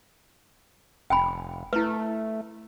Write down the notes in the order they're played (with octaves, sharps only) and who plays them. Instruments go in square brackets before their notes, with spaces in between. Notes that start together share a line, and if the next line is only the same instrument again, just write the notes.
[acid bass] F1 [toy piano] G5 G#5 B5
[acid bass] A3 [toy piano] E4 B4